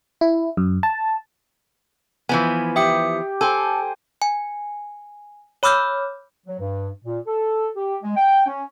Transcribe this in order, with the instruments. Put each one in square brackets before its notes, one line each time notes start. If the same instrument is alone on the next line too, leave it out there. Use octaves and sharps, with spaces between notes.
[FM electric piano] E4
F#2
A5
[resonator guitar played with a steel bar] E3 F3 B3 [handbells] G#5
[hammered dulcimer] G4 [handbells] E5 D#6 C#7
[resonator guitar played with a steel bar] A4 [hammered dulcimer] C5 [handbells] G5 G#5
[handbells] G#5
C#5 B5 D6 E6 F6 G6
[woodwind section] F#3
G2
A#2
A4
G4
G#3
G5
C#4